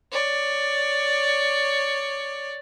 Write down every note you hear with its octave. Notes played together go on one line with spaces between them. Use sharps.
C#5 D5